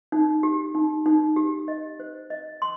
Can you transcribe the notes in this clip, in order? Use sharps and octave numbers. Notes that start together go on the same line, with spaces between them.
D#4
G4
D#4
D#4
G4
D#5
C5
D#5
C6